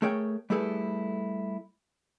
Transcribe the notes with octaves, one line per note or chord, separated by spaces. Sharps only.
A3 G#4 A#4 C#5 G5
G3 A3 E4 G#4 A4 B4